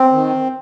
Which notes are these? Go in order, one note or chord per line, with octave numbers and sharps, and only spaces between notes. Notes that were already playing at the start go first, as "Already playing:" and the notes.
Already playing: C4
D#3